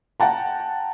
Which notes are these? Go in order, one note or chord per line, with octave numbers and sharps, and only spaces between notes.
F#5 G5 A5 A#5